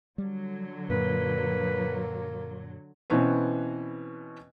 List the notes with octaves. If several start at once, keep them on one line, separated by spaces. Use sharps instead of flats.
D3 F#3 G3
F#2 A#2 A#3 B4
B2 E3 C4 C#4 B4